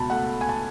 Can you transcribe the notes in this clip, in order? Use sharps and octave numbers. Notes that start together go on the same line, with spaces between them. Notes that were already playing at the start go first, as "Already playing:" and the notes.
Already playing: C#2 B2 A5 B5
A3 F#5
G#5
A5